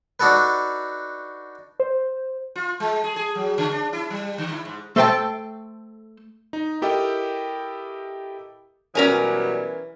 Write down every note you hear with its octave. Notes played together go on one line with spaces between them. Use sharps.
D4 D#4 F#4 A4 B4
C5
F4
G#3
G#4
G#4
F#3
C#3
D4
E4
G3
D3
E4
G#2
A3 A4 C5 D#5 G5 A5
D#4
E4 G4 A4 A#4 D#5 G5
B2 E3 F#3 G3 C#4 A#4 G#5